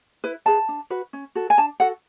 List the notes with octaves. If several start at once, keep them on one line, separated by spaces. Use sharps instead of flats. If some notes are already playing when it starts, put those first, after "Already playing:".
E4 B4
G#4 B4 A5
D4
F#4 B4
C#4
F#4 A4
G#5
D4 A5
F#4 A4 F#5